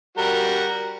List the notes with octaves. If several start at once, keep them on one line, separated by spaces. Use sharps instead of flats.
G3 F#4 A#4